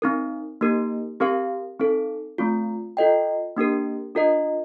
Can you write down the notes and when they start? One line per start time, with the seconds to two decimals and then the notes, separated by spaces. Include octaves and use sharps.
0.02 C4 D#4 A#4
0.61 A#3 D#4 G4 A#4
1.20 C4 G4 A#4 F5
1.80 C4 D#4 A4
2.38 A3 C4 F4
2.97 F4 A4 D#5 G5
3.57 A#3 D4 G4 A#4
4.15 D4 F4 A#4 D#5